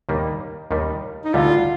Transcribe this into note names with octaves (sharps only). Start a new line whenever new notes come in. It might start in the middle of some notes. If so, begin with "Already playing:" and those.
D#2 D#3 G3 A#3
D#2 D#3 G3
D#4
D2 D3 G3 F4